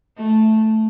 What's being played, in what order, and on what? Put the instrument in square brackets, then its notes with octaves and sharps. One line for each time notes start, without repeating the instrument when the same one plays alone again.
[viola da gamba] A3